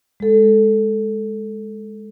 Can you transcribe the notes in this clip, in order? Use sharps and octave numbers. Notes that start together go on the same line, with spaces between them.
G#3 A4